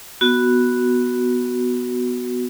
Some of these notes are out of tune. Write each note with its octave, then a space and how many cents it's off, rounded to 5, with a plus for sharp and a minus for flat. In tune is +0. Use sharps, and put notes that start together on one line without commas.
B3 +0 F#4 +0